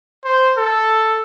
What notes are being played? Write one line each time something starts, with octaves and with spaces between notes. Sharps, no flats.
C5
A4